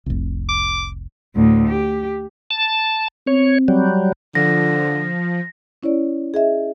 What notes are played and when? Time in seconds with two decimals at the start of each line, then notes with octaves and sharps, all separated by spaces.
0.06 F1 C2
0.49 D6
1.35 D2 A2
1.68 G4
2.51 A5
3.27 C4 C#5
3.68 F#3 G3
4.35 D3 F3 A#6
5.83 C#4 E4 C#5 D5
6.34 G#4 D#5 E5